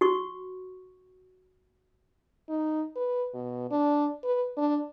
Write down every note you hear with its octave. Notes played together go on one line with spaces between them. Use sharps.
F#4 C#6
D#4
B4
B2
D4
B4
D4